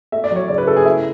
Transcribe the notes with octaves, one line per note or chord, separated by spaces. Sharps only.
A3 E5
D5
F#3
C#5
C#3 D5
B4
C#3 A4
G#4
A3 E4